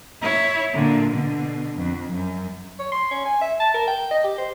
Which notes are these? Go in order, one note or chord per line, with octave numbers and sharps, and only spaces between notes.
E4 C#5
A#2 D3
B2 D3
F2
F#2
C#5
C6
C#4
G#5
E5
A5
A#4
G5
D#5
G4
C5